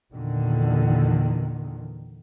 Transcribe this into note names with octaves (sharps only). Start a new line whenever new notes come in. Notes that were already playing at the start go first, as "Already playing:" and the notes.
E2 A#2 D3 D#3